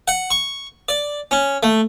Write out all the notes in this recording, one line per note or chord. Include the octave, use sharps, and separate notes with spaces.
F#5
C#6
D5
C#4
A3